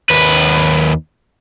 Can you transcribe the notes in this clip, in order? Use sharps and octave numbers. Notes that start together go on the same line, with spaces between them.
D#2 B4